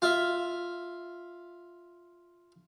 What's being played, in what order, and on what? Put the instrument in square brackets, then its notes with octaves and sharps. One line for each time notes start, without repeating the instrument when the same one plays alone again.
[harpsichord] F4 E5